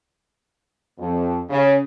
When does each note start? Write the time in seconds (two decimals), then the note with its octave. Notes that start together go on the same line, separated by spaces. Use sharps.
0.99 F2
1.49 C#3